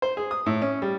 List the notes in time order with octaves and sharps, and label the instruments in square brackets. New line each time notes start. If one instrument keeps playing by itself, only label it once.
[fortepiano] C5
G#4
D#6
A2
C#4
G3